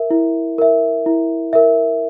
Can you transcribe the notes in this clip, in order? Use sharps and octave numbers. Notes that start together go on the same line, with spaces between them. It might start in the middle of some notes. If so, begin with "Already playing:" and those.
Already playing: A#4 E5
E4
A#4 E5
E4
A#4 E5